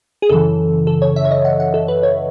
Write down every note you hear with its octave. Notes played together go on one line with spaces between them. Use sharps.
G#4
F#2 C#3 E3 A4
A4
C#5
E5
C#5
D#5
F#5
F#5
A4
B4
C#5